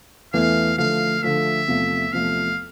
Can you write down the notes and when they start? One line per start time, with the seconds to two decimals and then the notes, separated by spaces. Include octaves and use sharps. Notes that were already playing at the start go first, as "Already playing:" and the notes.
0.33 E2 E3 A3 E4 F5
0.77 D3 F3 A3 F5
1.23 D3 F3 A3 E5
1.68 E2 C3 F3 A3
2.12 E2 C3 F3 A3 F5